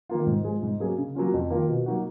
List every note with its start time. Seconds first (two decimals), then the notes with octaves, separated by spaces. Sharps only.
0.09 D#3 A#3 F4
0.26 G#2
0.44 F3 G#3
0.62 G#2
0.80 F#3 A#3 C#4 G#4
0.97 C#3
1.15 F#3 A#3 C#4 F4
1.34 F2
1.50 D#3 A#3 F4 A#4
1.68 B2
1.86 F#3 A#3 D#4 F#4